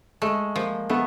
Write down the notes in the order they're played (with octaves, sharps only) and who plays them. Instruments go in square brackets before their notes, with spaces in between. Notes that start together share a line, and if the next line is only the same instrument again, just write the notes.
[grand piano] G#3 [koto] A3
[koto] F3 [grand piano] A#3
[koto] A3 [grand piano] B3